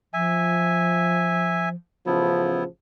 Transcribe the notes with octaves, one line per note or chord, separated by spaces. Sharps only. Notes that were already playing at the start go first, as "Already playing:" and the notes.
F3 E5 G#5
A1 C#3 F3 B3 E4